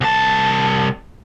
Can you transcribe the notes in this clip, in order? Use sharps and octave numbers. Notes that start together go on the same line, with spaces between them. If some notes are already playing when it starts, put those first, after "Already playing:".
C2 A5